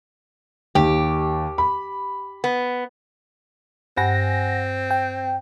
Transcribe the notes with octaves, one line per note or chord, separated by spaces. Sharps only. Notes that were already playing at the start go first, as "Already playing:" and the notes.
D#2 G4
B5
B3
G2 C4 F#5 G#5 A#6
G5